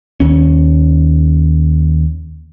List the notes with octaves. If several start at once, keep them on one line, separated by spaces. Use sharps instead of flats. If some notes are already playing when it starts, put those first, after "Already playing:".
D#2 C#4